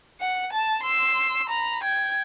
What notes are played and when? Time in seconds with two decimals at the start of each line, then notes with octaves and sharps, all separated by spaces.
0.21 F#5
0.52 A5
0.83 C6 E6
1.49 A#5 B5
1.83 G5 G#6